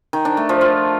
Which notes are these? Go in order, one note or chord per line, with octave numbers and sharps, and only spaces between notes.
D#3
D4
A3
F3
F4